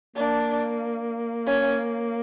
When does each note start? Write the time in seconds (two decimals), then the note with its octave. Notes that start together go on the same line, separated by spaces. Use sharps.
0.16 A#3 D4
1.47 C#4